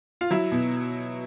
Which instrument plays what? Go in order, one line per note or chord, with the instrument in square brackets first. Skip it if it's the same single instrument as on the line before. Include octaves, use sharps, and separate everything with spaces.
[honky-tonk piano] F4
F#3 E4
B2